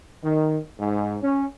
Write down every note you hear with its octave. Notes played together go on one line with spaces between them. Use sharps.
D#3
G#2
C#4